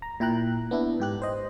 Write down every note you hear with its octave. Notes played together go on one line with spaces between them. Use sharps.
A#5
A#2 E4 G5 A#5 F#6
B3 D4 E4
G#2 G4 F#6
C5 D#5